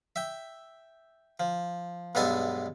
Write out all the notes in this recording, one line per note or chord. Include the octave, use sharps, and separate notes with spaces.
E5 G5
F3
B1 G2 G#3 B3 A4 G#5